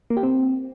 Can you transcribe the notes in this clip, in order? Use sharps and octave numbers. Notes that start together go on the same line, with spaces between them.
A#3
G4
C4